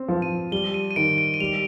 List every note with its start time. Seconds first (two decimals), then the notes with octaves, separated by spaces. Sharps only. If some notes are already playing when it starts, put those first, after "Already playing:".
Already playing: C4
0.08 F3
0.22 D#7
0.52 G3 G7
0.74 D#7
0.91 D#7
0.96 D#3 D7
1.18 D7
1.34 D#7
1.40 G3 F7